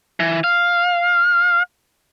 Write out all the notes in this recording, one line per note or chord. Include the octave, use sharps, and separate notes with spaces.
E3
F5